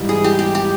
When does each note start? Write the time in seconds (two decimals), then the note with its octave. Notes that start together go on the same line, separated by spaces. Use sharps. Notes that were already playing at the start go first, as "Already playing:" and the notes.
Already playing: G#2 E3 G3
0.09 G#4
0.24 G4
0.39 G4
0.55 G4